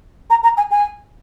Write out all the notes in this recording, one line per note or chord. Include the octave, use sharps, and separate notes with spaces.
A#5
A#5
G#5
G#5